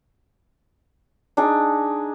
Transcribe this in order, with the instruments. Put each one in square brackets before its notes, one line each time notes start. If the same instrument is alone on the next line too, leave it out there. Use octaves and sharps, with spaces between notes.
[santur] D4 D#4 G#4